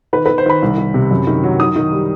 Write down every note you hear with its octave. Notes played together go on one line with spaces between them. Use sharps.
D#3 B4
D#3 B4
C5
D#3 B5
C2
D#3
C3
F#2
D#3
F#3
D#3 D#6
D#3
G3